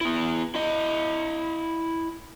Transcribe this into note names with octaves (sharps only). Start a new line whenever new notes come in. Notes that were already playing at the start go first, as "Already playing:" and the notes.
B3 E4
E4 D#5